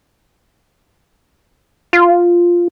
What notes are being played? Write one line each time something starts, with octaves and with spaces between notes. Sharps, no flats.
F4